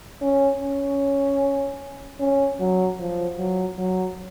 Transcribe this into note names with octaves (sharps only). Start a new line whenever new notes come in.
C#4
C#4
C#4
F#3
F3
F#3
F#3